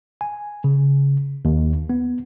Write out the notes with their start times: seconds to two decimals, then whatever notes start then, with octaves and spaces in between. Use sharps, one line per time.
0.21 G#5
0.64 C#3
1.45 D#2
1.90 B3